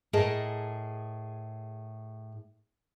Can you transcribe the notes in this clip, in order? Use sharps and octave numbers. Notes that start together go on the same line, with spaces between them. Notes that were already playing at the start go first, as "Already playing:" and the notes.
A2 G#4 A#4 D#5 A5